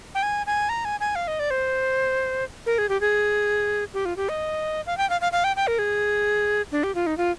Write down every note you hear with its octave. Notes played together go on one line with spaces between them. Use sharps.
G5
G#5
G#5
A#5
G#5
G#5
F5
D#5
D5
C5
A#4
G#4
G4
G#4
G4
F4
G4
D#5
F5
G5
F5
F5
F5
G5
G5
A#4
G#4
D4
G4
F4
D#4
F4